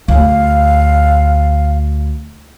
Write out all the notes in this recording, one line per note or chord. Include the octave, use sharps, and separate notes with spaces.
D2 F5